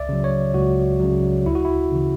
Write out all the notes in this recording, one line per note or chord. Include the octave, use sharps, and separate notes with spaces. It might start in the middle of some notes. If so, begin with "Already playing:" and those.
Already playing: C#2 D5 E5
C#3 F#3
C#5
C#2 F#4
C#3 F#3
D2 E4
F#4
E4
C#3 E3